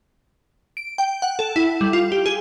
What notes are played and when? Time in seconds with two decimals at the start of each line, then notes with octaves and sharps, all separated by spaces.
0.77 D7
0.98 G5
1.22 F#5
1.39 A4
1.56 E4
1.81 G3
1.93 F4
2.12 G4
2.26 G#4